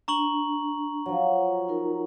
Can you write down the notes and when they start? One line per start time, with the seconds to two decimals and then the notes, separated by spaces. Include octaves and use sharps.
0.08 D4 A#5 C#6 F#7
1.06 F3 F#3
1.68 D#4 F4 A#4